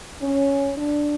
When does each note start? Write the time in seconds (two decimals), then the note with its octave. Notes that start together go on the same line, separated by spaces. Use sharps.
0.21 C#4
0.76 D4